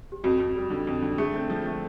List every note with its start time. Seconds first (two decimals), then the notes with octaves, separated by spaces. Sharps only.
0.12 G4
0.24 F2 F#4
0.40 F2
0.56 G3
0.70 D3
0.87 F2
1.02 D3
1.18 A3 G#4
1.34 C4
1.50 F3
1.66 A3